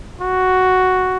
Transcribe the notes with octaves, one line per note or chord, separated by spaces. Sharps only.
F#4